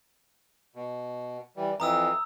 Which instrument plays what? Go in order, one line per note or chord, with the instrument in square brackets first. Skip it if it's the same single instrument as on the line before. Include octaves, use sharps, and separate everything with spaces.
[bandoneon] B2
E3 G3
[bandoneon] F2 E3 [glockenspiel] A#5 D#6 E6